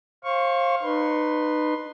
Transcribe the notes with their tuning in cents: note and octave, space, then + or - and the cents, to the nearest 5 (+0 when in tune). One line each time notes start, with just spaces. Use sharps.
C5 +30 F5 +0 C#6 +0
D#4 -30 B4 +0 C6 +10